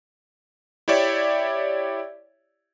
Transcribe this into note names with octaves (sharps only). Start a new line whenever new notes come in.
E4 G4 C#5 D5 E5